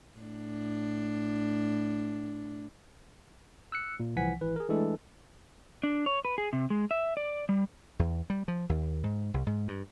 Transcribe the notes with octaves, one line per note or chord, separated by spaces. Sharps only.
A2 D4
E6 F#6 C#7
A#2
C2 E3 F3 F#5 G#5 B6
G#1 E3 B4
G#4 A#4
E3 G#3 A3 D4 A4
D4
C#5
B4
G#4
C3
G#3
E5
D5
G3
E2
G3
F3
D#2
G#2
C2
G#2
G2